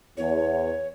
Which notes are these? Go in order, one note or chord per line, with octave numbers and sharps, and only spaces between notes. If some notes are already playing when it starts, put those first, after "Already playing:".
E2 C#5